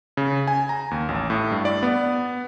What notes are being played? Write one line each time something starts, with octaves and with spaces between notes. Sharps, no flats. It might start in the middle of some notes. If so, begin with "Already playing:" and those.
C#3
G#5
A#5
D#2
A1
A2
G2
D5
B3